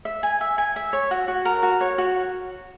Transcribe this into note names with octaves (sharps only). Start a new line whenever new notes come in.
E5
G#5
E5
G#5
E5
C#5
F#4
F#4
A#4
F#4
C#5
F#4